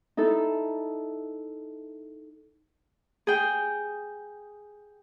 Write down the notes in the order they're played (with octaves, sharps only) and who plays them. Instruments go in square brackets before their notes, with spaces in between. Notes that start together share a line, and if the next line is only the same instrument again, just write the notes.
[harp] D#4 E4 A4
G#4 G5